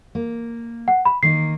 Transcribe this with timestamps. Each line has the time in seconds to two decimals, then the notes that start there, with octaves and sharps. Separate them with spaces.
0.15 A#3
0.88 F#5
1.05 B5
1.23 D#3 A#3 D#4 C7